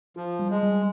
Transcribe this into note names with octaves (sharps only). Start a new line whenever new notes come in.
F3 F4
G3
G#3
G3